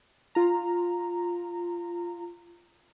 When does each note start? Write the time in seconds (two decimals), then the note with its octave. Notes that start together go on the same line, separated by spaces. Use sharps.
0.35 F4 A#5